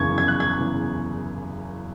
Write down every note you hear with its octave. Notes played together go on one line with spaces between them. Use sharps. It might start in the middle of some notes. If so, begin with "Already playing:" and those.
Already playing: F#1 E2 C#3 C#6 G#6
F#1 G#6
F#6
G#6
E2 C#3